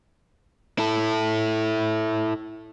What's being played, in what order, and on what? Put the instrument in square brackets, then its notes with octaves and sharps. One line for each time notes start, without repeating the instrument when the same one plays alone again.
[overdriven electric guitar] E4 A4